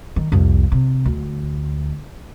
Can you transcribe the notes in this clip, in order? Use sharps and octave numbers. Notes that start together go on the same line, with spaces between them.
D#3
C2 F2
C3
D2